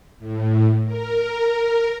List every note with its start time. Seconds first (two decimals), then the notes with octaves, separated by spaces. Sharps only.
0.19 A2
0.85 A#4